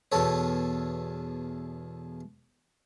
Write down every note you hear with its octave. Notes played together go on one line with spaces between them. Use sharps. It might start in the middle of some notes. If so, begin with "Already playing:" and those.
E2 B2 A4 C#5